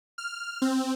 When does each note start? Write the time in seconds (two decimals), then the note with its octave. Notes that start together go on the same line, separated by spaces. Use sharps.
0.18 F6
0.62 C4